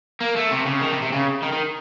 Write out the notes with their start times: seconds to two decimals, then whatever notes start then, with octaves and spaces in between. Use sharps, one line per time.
0.21 A#3
0.37 A3
0.51 C3
0.67 C#3
0.82 D#3
0.91 C3
1.02 C3
1.12 C#3
1.42 D#3
1.52 D#3